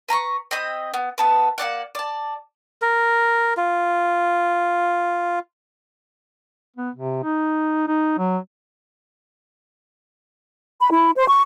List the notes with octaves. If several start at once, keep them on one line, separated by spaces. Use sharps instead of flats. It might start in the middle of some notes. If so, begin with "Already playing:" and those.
B4 A#5 C6 C#6
C4 D#5 B5 D#6
B3
B3 A4 B4
A#3 C4 D5 F#5
D5 A5
A#4
F4
B3
C3
D#4
D#4
F#3
B5
E4
C5
C#6